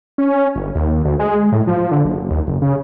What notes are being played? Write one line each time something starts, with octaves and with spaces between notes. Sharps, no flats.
C#4
G1
D#2
D2
G#3
A2
F3
D3
F#1
D#2
F#1
C#3